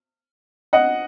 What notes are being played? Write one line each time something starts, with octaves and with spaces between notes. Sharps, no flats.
D#5 F#5